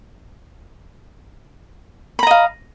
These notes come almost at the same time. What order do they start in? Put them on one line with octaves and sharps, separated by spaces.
B5 A#5 D#5 F5